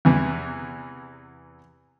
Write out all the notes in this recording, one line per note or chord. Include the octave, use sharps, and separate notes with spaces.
E2 C3 E3